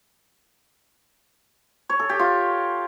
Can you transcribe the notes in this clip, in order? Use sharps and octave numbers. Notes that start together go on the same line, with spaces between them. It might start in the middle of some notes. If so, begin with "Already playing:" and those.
C#5
A4
G4
F4